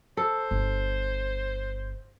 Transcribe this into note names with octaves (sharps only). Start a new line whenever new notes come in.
A4 C5
G1